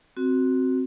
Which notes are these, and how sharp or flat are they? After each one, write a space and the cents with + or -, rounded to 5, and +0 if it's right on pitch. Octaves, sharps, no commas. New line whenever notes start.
C4 +0 F#4 +0